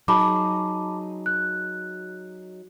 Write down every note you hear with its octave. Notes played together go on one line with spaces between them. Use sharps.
F#3 D#4 G#4 A5 B5 D6
F#6